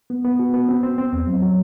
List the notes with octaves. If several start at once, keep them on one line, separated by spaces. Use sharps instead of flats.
B3
B3
F#4
B3
C4
C4
C4
E2
F#3
F#3